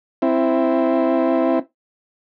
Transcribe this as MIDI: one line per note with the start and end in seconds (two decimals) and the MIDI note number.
0.22 1.59 60
0.22 1.59 64